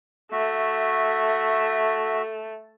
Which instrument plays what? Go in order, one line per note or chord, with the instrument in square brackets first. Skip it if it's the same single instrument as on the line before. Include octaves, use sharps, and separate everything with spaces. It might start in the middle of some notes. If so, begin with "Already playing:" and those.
[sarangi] A3 [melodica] F#4 E5